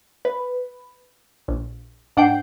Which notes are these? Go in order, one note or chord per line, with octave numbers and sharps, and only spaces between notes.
B4
A#1
G#2 D4 F#5 G5 G6 C7